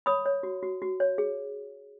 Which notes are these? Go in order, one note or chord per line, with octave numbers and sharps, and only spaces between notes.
C#5 B5 D#6
C#5
F#4
F#4
F#4
C#5
G#4